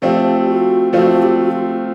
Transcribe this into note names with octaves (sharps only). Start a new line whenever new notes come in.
F3 A3 C4 F4 G4
F#4
F3 A3 C4 F4 F#4
G4
F#4
F4